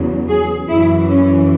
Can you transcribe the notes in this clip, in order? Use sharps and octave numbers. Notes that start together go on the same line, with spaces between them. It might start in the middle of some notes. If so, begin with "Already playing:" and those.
Already playing: E2 C#3 F#3
G#4
F#2 E3 E4
C#4